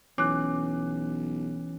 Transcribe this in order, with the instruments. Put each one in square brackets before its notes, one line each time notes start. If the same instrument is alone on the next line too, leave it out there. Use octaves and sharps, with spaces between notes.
[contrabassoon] B1 [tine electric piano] E3 C#4 [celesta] D6 F#6